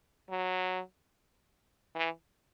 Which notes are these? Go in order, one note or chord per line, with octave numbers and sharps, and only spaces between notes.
F#3
E3